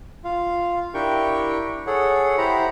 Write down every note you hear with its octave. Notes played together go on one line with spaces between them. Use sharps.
F4 F5
D4 E4 G4 A#4 G5 C#6
G#4 A4 C#5 F#5
E4 G4 C5 F#5 A#5 B5